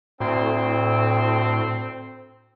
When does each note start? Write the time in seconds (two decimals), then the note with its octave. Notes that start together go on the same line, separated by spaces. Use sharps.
0.20 D2 A2 C4